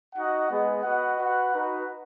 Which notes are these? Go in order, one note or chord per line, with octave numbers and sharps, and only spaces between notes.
D#4 F#4 D#5 F#5
G#3 B3 G#4 D#5
F#4 B4 D#5 F#5
F#4 B4 F#5
D#4 F#4 B4 F#5